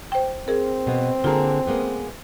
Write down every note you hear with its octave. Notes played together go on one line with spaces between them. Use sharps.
C5 G5
C4 G#4 A#4
B2 B3
D3 A#3 F4 G#4 A#5
G#3 A#3 B3